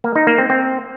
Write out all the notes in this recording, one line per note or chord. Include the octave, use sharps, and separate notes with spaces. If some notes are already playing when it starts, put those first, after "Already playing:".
A#3
D#4
A#3
C4
C4